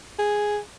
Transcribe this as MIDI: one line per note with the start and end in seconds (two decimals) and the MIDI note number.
0.19 0.59 68